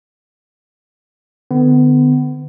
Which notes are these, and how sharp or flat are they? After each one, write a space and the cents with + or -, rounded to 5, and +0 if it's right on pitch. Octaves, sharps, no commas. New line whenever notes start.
D3 +30 B3 +25